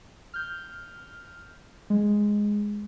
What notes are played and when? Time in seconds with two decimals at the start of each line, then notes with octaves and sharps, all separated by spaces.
0.34 F6 G6
1.90 G#3